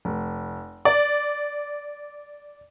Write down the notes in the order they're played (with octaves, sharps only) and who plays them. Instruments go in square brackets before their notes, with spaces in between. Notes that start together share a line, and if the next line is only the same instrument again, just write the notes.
[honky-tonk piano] F1
D5